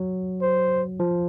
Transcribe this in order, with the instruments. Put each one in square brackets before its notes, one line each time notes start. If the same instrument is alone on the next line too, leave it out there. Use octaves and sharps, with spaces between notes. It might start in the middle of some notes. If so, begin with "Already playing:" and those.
Already playing: [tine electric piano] F#3
[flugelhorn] C5
[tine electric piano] F3